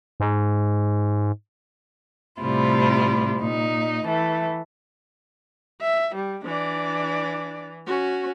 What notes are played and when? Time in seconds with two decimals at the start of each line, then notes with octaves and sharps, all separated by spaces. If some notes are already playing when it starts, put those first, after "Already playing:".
0.20 G#2
2.41 A2 C3 G3 E4 F4
3.39 A#2 D#4
4.05 E3 A3
5.81 E5
6.15 G3
6.45 E3 D4 D5
7.86 C#4 F#4